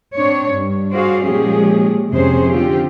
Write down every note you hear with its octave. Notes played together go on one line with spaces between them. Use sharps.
C4 D4 C#5
G2
F#4 G#4 C5 D5 F5
A#2 F3 G#3 C#4 G4 G#4
F2 C3 C#4 G#4 C5
D3 F3 C4 F4 G4